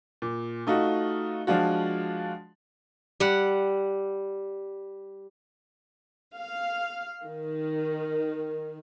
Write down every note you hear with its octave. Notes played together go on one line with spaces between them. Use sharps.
A#2
A3 D#4 F4 F#4
F3 G#3 D4 F4 F#4
G3 F#5
F5
D#3